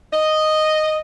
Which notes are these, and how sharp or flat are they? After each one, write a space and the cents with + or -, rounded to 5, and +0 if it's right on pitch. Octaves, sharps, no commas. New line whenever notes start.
D#5 -5